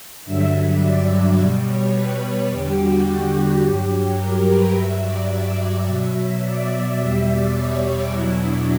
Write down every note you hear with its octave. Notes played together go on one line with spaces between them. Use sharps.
G2 D3 F#3 E5
D5
B2 G3
C#5
B4
E2 D3 G3 G4
F#4
G2 F#3 G4
A#4
B4
G2 F#3 E5
D5
D5
E5
B2 F#3
D5
E2 B2 G3 E5
D5
C#5
E2 B2 F#3 E4
D4